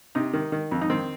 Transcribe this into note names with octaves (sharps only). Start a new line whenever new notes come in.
C3 D#4
D#3
D#3
F2
D#4
D#3 C4